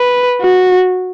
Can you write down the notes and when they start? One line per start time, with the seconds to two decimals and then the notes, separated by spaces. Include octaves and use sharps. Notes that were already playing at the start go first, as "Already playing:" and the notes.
Already playing: B4
0.41 F#4